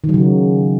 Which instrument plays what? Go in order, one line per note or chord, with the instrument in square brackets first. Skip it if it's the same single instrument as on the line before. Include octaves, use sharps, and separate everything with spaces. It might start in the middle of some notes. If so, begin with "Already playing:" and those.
[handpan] D#3
F#3
C#3